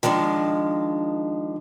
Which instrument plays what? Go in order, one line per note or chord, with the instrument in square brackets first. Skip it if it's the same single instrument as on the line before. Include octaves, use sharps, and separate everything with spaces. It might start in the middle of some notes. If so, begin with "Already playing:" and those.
[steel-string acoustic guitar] D#3 F3 G#3 D4